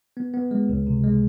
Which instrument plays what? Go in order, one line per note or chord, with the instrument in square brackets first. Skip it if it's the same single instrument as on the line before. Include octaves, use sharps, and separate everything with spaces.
[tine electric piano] B3
B3
G#3
C#2
C3
G#3